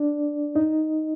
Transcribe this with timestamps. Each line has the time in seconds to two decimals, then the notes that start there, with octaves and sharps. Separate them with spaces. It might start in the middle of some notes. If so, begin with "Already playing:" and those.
Already playing: D4 D5
0.55 D#4 D#5